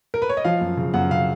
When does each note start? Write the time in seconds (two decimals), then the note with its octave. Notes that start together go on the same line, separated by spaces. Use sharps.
0.14 A#4
0.22 B4
0.29 C#5
0.37 D#5
0.44 F3 F5
0.61 F#2
0.77 C#3
0.94 F#2 F#5
1.11 C#3 F5